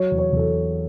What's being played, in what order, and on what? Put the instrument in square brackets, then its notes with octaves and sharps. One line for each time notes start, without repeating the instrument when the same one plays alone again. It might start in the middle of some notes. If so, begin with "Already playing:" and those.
Already playing: [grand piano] F#3 C#5
E2
C#5
E2 A4